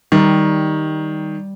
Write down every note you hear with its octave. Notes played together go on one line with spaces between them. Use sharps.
D#3 G3